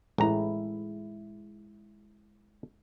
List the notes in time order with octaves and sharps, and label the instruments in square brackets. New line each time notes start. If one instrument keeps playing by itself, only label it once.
[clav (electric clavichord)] A1 A#5 [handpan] G#3 E4